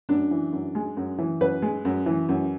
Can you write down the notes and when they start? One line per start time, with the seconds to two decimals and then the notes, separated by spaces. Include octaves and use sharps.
0.09 F#2 D4
0.31 E3
0.53 F#2
0.75 G#3
0.97 F#2
1.18 E3
1.41 F#2 B4
1.62 G#3
1.85 F#2
2.06 E3
2.29 F#2